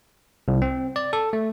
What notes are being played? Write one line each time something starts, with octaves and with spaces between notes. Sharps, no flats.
C2
C4
D5
A4
A3